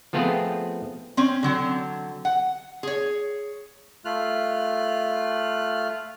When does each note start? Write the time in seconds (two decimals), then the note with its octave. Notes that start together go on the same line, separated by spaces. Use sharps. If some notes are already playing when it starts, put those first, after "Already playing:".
0.13 F3 A3 B3 C4 F4 G#4
1.17 C4 C#4
1.43 D3 F#3 C4
2.25 F#5
2.83 G#4 C#5
4.05 A3 F4 F6 F#6